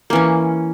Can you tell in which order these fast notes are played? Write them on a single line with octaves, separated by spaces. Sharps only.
A#3 E3 C#4